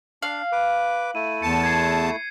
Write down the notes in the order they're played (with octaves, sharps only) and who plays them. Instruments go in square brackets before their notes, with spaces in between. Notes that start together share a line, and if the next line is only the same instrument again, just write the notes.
[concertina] D4 [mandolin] F5 [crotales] F#7
[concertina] B4 D6
[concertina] A3 E4 [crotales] D#7
[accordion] E2 A5 [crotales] C#7
[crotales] G#6 C7